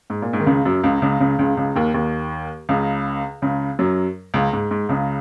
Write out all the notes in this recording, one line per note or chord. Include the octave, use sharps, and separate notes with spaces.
G#2
A#2
G#2
D#3
C#2 C#3
F#2 F#3
C#2 C#3
C#2 C#3
C#2 C#3
C#2 C#3
C#2 C#3
D#2 D#3
D#2 D#3
C#2 C#3
C#2 C#3
F#2 F#3
C#2 C#3
G#2
G#2
C#2 C#3